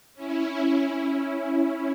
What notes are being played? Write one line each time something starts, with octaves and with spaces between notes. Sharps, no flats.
C#4 E4